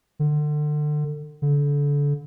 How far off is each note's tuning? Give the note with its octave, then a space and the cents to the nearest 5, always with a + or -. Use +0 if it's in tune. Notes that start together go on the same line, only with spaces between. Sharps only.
D3 +30
D3 -30